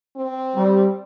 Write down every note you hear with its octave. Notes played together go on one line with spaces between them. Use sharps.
C4
G3